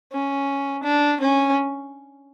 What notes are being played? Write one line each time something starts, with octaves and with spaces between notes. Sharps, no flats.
C#4
D4
C#4